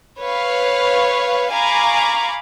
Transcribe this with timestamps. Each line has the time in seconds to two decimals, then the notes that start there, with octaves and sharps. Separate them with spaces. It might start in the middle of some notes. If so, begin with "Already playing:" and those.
0.19 B4 C#5 F5
1.52 F5 G#5 A#5 B5 C#6 D6